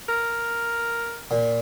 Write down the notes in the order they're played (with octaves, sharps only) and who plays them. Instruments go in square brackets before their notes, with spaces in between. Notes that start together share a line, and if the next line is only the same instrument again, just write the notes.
[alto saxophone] A#4
[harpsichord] A#2